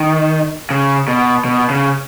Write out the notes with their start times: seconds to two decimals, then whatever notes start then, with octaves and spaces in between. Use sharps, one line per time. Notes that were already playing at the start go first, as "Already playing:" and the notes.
Already playing: D#3
0.70 C#3
1.08 B2
1.45 B2
1.70 C#3